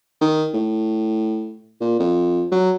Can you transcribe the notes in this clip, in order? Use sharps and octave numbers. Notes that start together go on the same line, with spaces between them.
D#3
A2
A#2
F2
F#3